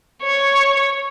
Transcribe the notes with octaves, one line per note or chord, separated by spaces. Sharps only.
C#5